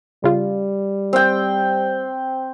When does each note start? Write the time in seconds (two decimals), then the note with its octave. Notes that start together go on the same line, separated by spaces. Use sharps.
0.24 C#3 G3 F4
1.13 C4 G5